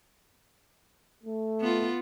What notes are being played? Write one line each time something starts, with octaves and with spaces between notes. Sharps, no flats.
A3
B3 F4